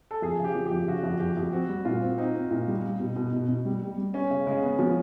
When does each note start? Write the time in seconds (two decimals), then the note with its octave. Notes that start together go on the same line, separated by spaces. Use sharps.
0.11 A4
0.22 F2 G#4
0.39 C#3 G4
0.55 F3
0.66 G4
0.71 F2
0.88 C#3 F#4
1.04 F2
1.20 F2 G4
1.37 F2
1.53 C4 F#4
1.69 G3
1.85 A#2 F4
2.02 C4
2.18 C4 D#4
2.35 C4
2.51 A#2
2.68 G3
2.84 G3
3.00 B2
3.16 B2
3.32 B2
3.49 B2
3.65 G3
3.82 G3
3.98 G3
4.14 B3 C#4
4.30 C#3
4.46 C#3 G#3
4.62 B3
4.79 F3 B3